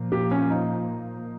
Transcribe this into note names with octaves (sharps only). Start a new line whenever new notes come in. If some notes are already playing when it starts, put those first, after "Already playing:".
Already playing: A#2 F3 A#3
G4
C#4
D#4